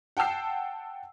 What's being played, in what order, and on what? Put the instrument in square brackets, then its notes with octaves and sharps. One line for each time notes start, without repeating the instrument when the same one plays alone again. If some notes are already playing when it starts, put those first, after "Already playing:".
[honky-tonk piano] F#5 G5 A5 E6 C7